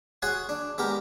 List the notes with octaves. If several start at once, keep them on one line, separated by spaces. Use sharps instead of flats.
F#4 G#4 C#5 F#5 G#5 C6
D4
G#3 B3 G4 A#4